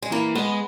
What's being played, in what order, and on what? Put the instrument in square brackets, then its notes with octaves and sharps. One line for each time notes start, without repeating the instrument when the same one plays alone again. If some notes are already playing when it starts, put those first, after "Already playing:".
[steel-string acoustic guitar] G#3
[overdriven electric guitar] E3 [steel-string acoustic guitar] A#3
[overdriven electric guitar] G#3 [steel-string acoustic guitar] B3